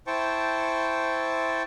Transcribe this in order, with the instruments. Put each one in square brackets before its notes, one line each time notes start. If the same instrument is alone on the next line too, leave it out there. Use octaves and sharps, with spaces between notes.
[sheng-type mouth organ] E4 C5 G5 A5 C#6